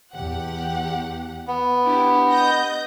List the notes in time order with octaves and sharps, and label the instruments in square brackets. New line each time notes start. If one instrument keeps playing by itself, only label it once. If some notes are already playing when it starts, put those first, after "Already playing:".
[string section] E2 G4 F#5
[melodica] B3
[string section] D4 E4 G4
D#5 G6 A#6